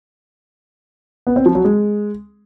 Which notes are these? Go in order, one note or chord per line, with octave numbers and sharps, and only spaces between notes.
B3
C4
F3
F#3
G#3